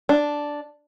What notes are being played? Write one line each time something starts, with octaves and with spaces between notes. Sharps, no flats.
D4